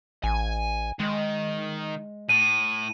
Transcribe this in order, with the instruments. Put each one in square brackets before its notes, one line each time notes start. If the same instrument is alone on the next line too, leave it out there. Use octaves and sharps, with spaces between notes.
[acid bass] A1 [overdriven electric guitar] G#5
[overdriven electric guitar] D#3 [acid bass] G#3
[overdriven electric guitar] A2 [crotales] D#7